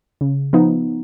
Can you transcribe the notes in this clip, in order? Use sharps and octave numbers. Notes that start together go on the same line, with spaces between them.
C#3
F3 B3 D#4